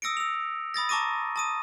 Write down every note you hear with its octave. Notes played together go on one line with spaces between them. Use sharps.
D#6 E6 A#6 C#7 D7
E6 F7
B5 D#6 A6 A#6
A5 A#5 C#6 D6 A#6 D#7
A5 D#6 D#7